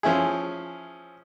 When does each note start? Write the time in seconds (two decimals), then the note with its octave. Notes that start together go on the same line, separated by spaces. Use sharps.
0.03 F3 C#4 E4 G#4